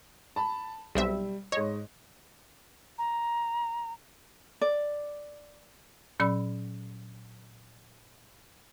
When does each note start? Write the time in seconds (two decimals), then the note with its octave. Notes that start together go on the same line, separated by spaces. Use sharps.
0.36 A5 B5
0.95 B1 G3 C4 E5
1.52 G#2 C#5 D#5
2.98 A#5
4.61 D5
6.20 A#2 F#3 C#4 D5 B5 E6